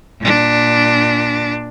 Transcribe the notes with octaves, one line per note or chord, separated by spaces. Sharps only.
A#2 D4